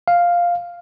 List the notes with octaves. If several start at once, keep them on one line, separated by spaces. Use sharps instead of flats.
F5